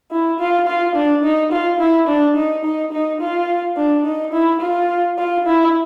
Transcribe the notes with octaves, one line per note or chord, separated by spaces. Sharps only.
E4
F4
F4
D4
D#4
F4
E4
D4
D#4
D#4
D#4
F4
D4
D#4
E4
F4
F4
E4